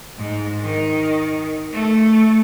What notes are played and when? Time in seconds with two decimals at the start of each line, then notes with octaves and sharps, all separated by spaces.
0.17 G#2
0.60 D#3
1.73 A3